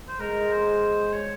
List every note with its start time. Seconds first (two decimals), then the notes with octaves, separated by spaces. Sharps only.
0.08 C5
0.20 G#3 A#4
0.51 C5
1.13 C#5